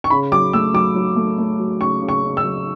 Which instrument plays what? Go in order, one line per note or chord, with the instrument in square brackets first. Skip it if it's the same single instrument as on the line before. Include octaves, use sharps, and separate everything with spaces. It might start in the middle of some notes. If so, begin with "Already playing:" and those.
[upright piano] C#6
C#3 B5
F#3 D6
A3 E6
F#3 D6
F#3
A3
A3
F#3
C#3 C#6
C#3
C#6
C#3
E6
F#3